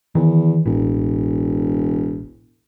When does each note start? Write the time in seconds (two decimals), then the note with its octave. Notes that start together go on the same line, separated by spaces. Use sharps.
0.15 E2 D#3 E3
0.66 E1 A1